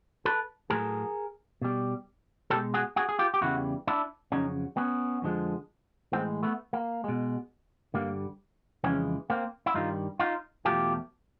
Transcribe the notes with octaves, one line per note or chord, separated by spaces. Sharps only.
A4 B4
A2 F#3 A3 G#4 A#4
B2 G3
B2 G#3 G4 A4
F#4 G#4
F#4 G#4
G#4
F4 G4
G4
E2 C#3 E3 G3 E4 F#4
D4 E4
F2 C#3 F#3 C#4 D#4
B3 C#4
F2 D3 F3 G#3
A2 E3 G#3 A#3 C4
A3 B3
A#3
B2 G#3
G2 D3 G3 A#3
F2 C#3 E3 G#3 B3 C#4
A#3 C4
E4
G2 D#3 G3 D#4 F4
D#4 F4
E2 B2 F#3 A3 F4 G4